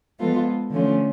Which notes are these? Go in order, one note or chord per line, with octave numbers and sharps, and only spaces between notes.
F3 G#3 B3 F4 A4
D3 F3 A3 C#4 F4